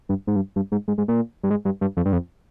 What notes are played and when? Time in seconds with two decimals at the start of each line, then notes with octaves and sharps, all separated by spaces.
0.09 G2
0.27 G#2
0.36 G2
0.56 G2
0.72 G#2
0.88 G#2
0.98 G#2
1.08 A#2
1.43 G2
1.50 G#2
1.65 G2
1.81 G2
1.97 F2
2.05 G2
2.13 F2